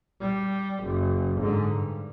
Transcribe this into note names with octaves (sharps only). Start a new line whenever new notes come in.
G3
F#1
G#2 D3
G2